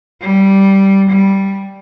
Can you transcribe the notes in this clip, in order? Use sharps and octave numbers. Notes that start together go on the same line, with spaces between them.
G3
G3